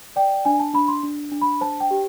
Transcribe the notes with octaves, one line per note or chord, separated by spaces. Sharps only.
D5 G5
D4 G#5
A5
D4 B5
C6
D4
D4
B5
C5 A5
G5
G4